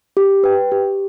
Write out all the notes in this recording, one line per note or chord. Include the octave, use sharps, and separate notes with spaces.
G4
B4 G5
G4